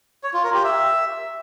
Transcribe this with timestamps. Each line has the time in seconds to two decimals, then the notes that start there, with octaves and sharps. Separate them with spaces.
0.23 C#5
0.34 F4
0.44 A#4
0.54 G4
0.64 E5